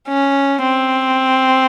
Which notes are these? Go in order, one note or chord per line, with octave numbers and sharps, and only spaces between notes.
C#4
C4